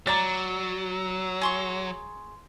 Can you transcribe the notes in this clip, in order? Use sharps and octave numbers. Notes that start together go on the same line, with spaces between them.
F#3 D5 A#5 A6
G#4 C6 C#6